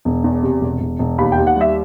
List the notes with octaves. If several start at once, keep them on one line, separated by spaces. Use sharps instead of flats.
E1
E2
C3
E1
E1
E1
D#2 B5
G5
D#2
F#5
G3 E5